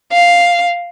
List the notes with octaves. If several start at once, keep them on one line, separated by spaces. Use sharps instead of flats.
F5